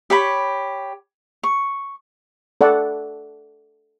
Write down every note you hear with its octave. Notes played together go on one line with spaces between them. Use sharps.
G4 C#5 B5
C#6
A4 D5 F#5